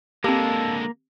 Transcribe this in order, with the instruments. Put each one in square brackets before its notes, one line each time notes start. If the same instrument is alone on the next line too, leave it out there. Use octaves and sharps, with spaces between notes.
[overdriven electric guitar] D3 G#3 [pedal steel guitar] A#3 [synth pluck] C4 G4 [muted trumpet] A4